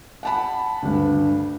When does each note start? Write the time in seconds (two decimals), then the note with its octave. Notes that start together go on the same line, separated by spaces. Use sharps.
0.23 F#5 A5 B5
0.82 D2 G2